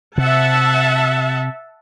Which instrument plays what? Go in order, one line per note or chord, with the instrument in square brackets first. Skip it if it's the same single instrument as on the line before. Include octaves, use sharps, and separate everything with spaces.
[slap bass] C3 [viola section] E5 F#5 A5